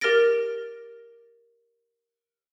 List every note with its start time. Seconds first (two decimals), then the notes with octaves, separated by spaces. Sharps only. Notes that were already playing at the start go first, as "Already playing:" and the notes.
0.01 G4 A#4 F6 A6 A#6 D7